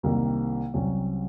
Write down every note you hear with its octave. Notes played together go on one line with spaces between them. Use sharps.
C2 C3 D#3 A#3
C2 C3 F#3 C#4